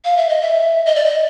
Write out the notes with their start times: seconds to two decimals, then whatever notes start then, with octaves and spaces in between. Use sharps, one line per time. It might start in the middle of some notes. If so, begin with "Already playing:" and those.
0.05 F5
0.17 E5
0.29 D#5
0.42 E5
0.86 D#5
0.96 D5
1.05 D#5